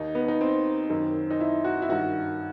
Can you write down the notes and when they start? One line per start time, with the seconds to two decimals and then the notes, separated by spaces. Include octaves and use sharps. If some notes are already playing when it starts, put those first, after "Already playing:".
Already playing: D#2 D#3 D#4
0.15 B3
0.28 D#4
0.41 C4
0.90 F#2 D#3
1.30 D#4
1.40 E4
1.64 F#4
1.82 E4
1.89 G2 D#3 F#4